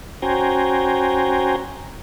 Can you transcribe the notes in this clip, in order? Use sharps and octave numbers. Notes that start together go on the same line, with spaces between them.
C#4 F#4 C5 G5 G#5 A#5